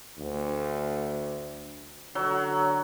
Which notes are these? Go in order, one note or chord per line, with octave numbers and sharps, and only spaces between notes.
D2
D3 F#3